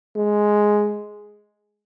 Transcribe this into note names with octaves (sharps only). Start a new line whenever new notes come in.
G#3